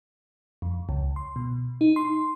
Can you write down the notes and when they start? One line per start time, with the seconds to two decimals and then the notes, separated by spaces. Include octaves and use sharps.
0.62 F2
0.89 C#2
1.16 C6
1.36 B2
1.81 D#4
1.96 C6